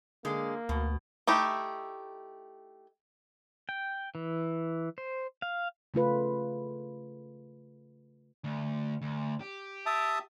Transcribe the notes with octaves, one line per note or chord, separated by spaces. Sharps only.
D3 G#3 A#3
D2 B2
A3 D#4 E4 G4
G5
E3
C5
F5
C#3 A3 F4 B4
D2
D2
G4
E5 A5 D#6